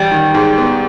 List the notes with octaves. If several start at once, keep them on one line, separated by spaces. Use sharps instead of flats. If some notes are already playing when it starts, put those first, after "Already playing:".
Already playing: A1 G3
D#3
G#2
B3